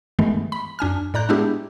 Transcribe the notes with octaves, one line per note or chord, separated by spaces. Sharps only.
G2 D#3 E3 G#3 A3 B3
B5
F#2 D4 G#5 F6
A2 D5 A#5 F#6 G6
G#3 B3 D4 E4 G4 G#4